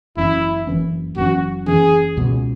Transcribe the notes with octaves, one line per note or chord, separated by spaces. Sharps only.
F#1 F#2 E3 C#4 E4
F#1 F#2 E3 C#4
F#1 F#2 E3 C#4 F#4
F#1 F#2 E3 C#4 G#4
C#2 B2 B3